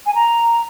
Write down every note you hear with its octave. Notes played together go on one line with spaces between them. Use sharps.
G#5
A#5